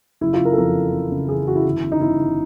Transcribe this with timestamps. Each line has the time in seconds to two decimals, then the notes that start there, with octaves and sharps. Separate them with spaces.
0.21 F#1 E4
0.34 F4
0.39 F#1
0.45 A#4
0.53 A4
0.58 F2 A#4
0.75 E3
0.93 C#3
1.12 C#3
1.29 E3 G#4
1.47 E3 F#4
1.55 E4
1.65 G1
1.83 C#3
1.92 D#4
2.01 G1 E4
2.19 G1